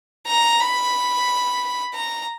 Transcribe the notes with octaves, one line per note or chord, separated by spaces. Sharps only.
A#5
B5
A#5